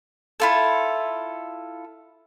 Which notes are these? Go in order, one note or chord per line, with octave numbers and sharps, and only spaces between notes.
E4 F4 A4